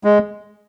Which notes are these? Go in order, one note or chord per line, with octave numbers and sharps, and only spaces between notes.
G#3